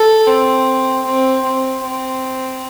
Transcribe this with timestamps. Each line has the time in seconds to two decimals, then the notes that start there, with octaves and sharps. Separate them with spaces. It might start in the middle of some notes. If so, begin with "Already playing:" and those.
Already playing: A4
0.27 C4
1.05 C4
1.44 C4
1.83 C4